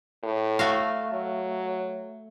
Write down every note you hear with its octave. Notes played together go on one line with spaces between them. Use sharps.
A2
A3 F#4 F5
F#3